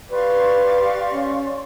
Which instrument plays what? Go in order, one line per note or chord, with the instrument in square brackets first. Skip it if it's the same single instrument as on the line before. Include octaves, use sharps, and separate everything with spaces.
[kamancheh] G4 F5 [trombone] B4 [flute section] D5 C6 C#6
[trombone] C#4